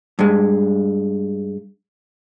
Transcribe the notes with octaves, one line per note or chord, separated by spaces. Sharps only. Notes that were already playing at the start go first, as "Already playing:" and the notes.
G2 G#3